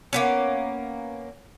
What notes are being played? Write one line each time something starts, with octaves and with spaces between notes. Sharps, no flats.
A#3 B3 C#4